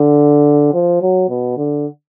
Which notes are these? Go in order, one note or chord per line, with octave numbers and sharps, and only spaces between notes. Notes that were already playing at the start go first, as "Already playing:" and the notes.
Already playing: D3
F3
F#3
B2
D3